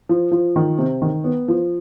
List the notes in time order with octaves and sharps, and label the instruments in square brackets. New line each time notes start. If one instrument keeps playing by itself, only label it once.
[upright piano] F3
F3
D#3
C3
D#3
B3
F3